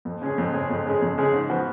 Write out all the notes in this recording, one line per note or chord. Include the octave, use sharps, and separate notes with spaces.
F2
C#3 G#3 C#4 G#4
F2
C#3 G#3 C#4 G#4
F2
C#3 G#3 C#4 G#4
F2
C#3 G#3 C#4 G#4
G#2
F3 B3 F#4